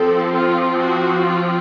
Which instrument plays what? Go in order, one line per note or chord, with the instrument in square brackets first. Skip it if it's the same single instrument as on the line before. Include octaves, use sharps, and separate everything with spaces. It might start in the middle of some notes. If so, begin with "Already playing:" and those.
Already playing: [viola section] F3 C4 A4
F4
F#4
F4